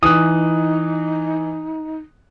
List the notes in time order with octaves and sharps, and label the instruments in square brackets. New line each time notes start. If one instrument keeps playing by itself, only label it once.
[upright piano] E3 F#6 [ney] D#4 [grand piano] D#6